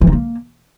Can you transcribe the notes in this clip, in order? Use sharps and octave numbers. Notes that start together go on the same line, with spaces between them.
E3
D#4
A#3